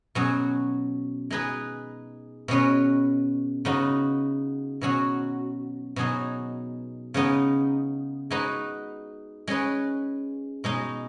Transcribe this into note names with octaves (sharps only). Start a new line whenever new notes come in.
B2 F#3 C#4 G#4
G#3 D#4 G#4 B4
B2 G#3 C#4 B4
C#3 B3 D#4 F#4
B2 F#3 C#4 F#4
B2 F#3 D#4 G#4
C#3 G#3 B3 D#4
G#3 D#4 F#4 B4
G#3 C#4 G#4 B4
B2 G#3 D#4